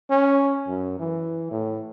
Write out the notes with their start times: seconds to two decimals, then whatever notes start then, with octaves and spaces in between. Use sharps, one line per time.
0.11 C#4
0.68 F#2
0.99 E3
1.51 A2